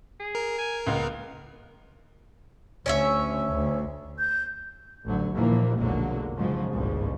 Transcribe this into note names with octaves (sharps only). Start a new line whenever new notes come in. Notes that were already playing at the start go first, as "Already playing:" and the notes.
G#4
A#4
G#5
C#2 A#3 B3
D2 C#4 C#5 E5
D2
G6
A1 D2 D3 F#3
D#2 A#2 D3 E3 F3 A#3
F1 B1 D3 F#3 G#3 A#3
G#2 C#3 F3 F#3
G#1 C#2 G2 A#2 C#3 G#3